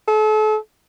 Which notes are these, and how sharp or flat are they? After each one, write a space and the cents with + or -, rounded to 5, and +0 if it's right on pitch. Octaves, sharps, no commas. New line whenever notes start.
A4 -40